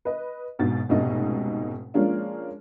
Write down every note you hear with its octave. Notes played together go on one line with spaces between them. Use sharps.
B4 D#5
G#1 G#2 B2 A6
F1 C#2 G#2 B2 A3 D#5
F3 G#3 A#3 C#4 D4 F4